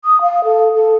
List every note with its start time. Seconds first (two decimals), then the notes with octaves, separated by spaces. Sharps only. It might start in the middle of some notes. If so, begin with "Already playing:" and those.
0.05 D#6
0.21 F5
0.44 A4
0.75 A4